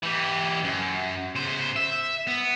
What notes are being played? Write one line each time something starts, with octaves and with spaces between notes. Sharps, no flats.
E3 G4
F#2
C#3 C5
E5
B3